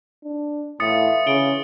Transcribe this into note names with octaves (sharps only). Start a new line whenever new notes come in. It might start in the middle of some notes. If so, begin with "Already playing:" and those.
D4
A2 E3 F4 D#6 A6 C#7
C#3 C#7 D7 G7